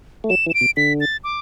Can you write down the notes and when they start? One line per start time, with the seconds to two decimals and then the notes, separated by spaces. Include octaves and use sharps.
0.24 A3
0.30 F#3 E7
0.46 E3
0.50 E7
0.54 D7
0.61 B2
0.77 D3 B6
1.01 A6
1.24 D6